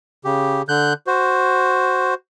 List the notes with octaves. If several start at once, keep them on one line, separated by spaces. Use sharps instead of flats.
C#3 G4
D3 F#6 G6
F#4 C5